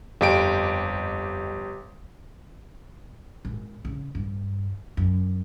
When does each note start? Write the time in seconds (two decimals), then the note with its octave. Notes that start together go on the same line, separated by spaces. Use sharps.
0.21 G1 F2 G4 D7
3.45 G#1
3.85 C#3
4.15 G2
4.97 F#2